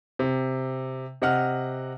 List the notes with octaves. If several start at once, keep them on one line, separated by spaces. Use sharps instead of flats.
C3
C3 D#5 F#5 F6